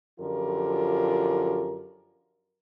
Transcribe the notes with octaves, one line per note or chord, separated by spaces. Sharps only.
F#2 D3 F3 F4 G4 A#4